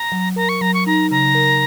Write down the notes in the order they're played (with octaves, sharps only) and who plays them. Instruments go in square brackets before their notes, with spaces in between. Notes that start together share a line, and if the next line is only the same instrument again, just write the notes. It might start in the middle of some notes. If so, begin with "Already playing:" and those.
Already playing: [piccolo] A#5
[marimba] F#3
[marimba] A#4 [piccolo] A#5
[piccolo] C#6
[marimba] F#3 [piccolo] A#5
[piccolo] C#6
[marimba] D#4 [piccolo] A#5
[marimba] C#3 [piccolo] A#5
[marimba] A#4